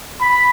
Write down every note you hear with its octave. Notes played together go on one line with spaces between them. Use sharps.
B5